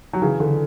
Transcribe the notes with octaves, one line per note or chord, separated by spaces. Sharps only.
F#3
C#3 E3
D3